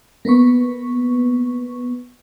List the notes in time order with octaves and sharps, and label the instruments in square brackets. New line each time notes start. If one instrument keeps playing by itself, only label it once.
[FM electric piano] A#3 B3 B4 C#6